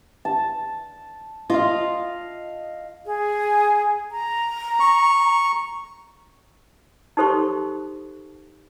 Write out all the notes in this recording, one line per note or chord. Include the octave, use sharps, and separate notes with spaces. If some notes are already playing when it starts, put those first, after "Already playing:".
A5
F4 D#5 F5
G#4
A#5
C#6
D#4 G4 A4 C5 C6 C#6